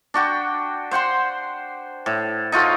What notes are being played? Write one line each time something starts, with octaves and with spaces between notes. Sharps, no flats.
D4 F#4 G5
C5 F#5 G5 C6
A2
D#4 F4 F#4 A4